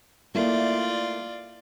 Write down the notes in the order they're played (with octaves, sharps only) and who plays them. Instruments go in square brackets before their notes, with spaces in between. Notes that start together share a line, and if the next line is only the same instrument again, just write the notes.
[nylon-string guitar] A3 A#3 E4 [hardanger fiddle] F4 D5